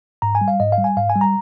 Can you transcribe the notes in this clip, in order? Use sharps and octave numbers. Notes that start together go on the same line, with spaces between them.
G#2 A#5
G#5
G3
F5
G#2 D#5
F5
G3
G#5
G#2 F5
G#5
G3
A#5